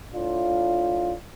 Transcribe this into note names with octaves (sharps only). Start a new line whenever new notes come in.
A2 D4 F4